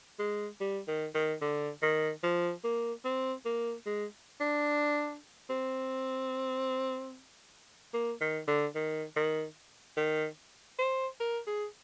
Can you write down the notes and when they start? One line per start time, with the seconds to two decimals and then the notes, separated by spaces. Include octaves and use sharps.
0.19 G#3
0.61 G3
0.88 D#3
1.15 D#3
1.42 D3
1.82 D#3
2.23 F3
2.64 A#3
3.05 C4
3.45 A#3
3.86 G#3
4.41 D4
5.50 C4
7.94 A#3
8.21 D#3
8.48 D3
8.75 D#3
9.16 D#3
9.97 D#3
10.79 C5
11.20 A#4
11.47 G#4